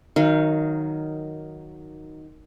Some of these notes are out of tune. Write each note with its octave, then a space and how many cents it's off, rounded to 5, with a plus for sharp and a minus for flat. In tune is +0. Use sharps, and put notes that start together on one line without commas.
D#3 +0 F#3 +0 F5 -30